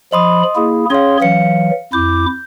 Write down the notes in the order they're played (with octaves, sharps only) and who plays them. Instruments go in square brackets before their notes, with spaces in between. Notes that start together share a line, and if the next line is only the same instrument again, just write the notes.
[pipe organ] F3 B5 [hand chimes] D#5 C6 D#6
[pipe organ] A#3 E4 G#4
[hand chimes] C#4 F5 [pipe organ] G#4 C#5 C6
[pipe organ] E3 F#3 [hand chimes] F5 C#7
[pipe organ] F2 E4 D6 [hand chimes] G6